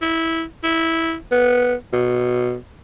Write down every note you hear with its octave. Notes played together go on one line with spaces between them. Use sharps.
E4
E4
B3
B2